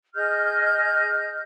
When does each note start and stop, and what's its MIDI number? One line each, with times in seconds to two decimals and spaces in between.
0.15 1.41 68
0.15 1.41 75
0.15 1.41 89
0.15 1.41 91